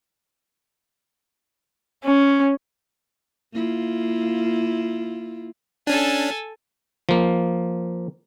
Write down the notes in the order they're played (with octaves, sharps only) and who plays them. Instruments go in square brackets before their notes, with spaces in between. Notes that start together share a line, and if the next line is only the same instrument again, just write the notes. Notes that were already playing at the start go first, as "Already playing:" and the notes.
[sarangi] C#4
[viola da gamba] A#3 E4 F4
[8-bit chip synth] C#4 D4 [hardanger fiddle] A4 G#5
[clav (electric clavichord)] F3 A#3